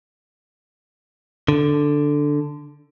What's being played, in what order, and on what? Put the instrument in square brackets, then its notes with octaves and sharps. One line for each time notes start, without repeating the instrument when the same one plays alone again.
[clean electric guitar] D3